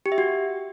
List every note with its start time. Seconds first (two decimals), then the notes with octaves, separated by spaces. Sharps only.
0.06 G4
0.12 E5
0.18 F#4